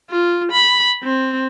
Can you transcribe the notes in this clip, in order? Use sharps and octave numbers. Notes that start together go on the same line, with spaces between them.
F4
B5
C4